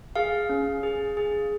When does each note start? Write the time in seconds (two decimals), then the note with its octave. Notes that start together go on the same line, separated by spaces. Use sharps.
0.16 G#4 F5
0.49 C#4
0.83 G#4
1.17 G#4